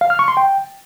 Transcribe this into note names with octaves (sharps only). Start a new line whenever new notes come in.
F5
F6
C#6
C6
G5